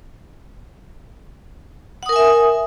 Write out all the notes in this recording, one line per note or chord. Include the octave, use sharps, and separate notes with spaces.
A#4 E5 F#5 G#5 D#6